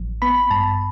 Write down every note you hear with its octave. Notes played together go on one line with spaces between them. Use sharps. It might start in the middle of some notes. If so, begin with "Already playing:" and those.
Already playing: A1 F3
B3 B5
G2 A5